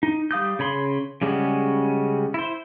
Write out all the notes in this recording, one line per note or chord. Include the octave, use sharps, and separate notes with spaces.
D#4
G3 F5 D#6 G6
C#3 C#5 B5 C6
C#3 G3 G#3 C#4 F#4
E4 C5